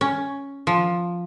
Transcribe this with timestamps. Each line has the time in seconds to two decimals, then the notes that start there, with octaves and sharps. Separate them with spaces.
0.01 C#4
0.67 F3